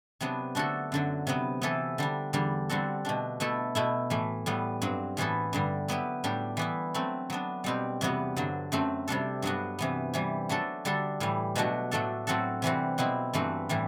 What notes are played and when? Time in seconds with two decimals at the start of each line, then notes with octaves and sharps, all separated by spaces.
0.21 C3 F#3 B3 D4
0.55 D3 A3 D4 F#4 A4
0.92 F#2 D3 F#3
1.27 C3 F#3 B3
1.62 C3 E3 B3 E4 A4
1.98 D3 G3 D4
2.33 E2 D3 G3
2.69 D3 G3 C4 F#4 A4
3.05 B2 A3 D4
3.40 B2 A3 E4 A4
3.75 B2 A3 E4
4.10 A2 E3 A3
4.46 A2 G3 B3
4.82 G2 F#3 C4
5.17 A2 E3 B3 E4 A4
5.53 G2 D3 G3
5.88 F#3 B3 E4 G4
6.24 A2 G3 D4 G4
6.57 E3 B3 E4
6.94 F#3 A3 C4
7.30 F#3 B3 D4
7.64 B2 G3 C4 G4
8.01 E2 C3 G3 B3 F#4
8.36 G2 D3 F#3
8.72 F#2 F#3 A3 C4
9.08 C3 G3 D4 A4
9.42 G2 F#3 B3 D4 F#4
9.79 C3 E3 B3
10.14 C3 E3 G3
10.49 F#3 A3 D4 A4
10.85 D3 G3 D4 A4
11.20 A2 E3 G3
11.55 B2 F#3 A3 D4 F#4
11.91 A2 F#3 A3 D4 A4
12.27 A2 F#3 C4 F#4 A4
12.62 C3 E3 G3 C4 F#4
12.98 B2 F#3 C4 E4 G4
13.34 G2 E3 A3 C4 F#4
13.69 A2 E3 G3